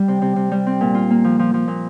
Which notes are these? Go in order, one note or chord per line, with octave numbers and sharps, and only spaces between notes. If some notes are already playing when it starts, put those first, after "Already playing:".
Already playing: G3
C3
C3
C3
G3
C4
A#2
F4
A#3
F3
F3
F3
A#2